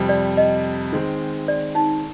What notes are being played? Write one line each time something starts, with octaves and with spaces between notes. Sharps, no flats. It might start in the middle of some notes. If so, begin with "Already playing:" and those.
Already playing: F2 C3 G3
D5
D#5
D#3 G#3 C4
D5
D#4